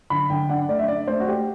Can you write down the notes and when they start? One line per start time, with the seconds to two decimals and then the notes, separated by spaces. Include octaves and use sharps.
0.10 D3 B5
0.30 D3 G5
0.49 D4 F#5
0.69 A3 D5
0.79 E5
0.88 D4 D5
1.08 A3 C5
1.20 F#4
1.27 A3 G4